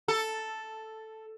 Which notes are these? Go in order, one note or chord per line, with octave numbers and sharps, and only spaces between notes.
A4